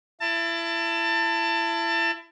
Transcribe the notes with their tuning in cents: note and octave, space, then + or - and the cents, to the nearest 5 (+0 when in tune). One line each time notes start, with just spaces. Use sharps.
E4 +25 A5 +25